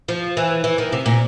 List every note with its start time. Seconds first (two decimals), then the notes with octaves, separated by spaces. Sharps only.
0.08 F3
0.37 E3
0.64 E3
0.78 D#3
0.92 C3
1.06 A#2